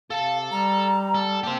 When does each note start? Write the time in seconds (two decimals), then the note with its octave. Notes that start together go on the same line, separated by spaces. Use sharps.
0.11 C3 A4 F5 A5
0.52 G3 A#5
1.15 A4
1.43 A#3 G4 C5 A5